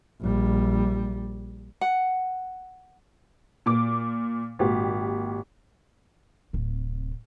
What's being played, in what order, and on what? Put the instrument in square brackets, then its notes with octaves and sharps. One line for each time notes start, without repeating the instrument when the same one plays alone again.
[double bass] A#1 G3
[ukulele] F#5
[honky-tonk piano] A#2 D6
G#1 A#2 G4
[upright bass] D1 C3